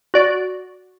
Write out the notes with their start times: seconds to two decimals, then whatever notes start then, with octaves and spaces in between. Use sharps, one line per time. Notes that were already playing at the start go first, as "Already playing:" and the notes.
0.14 F#4 D5